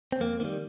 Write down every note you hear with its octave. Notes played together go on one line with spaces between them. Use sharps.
C4
F2 A#3
D#3 G3 A#3